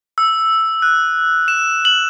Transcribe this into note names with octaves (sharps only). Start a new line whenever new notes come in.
E6
F#6
E7
F#7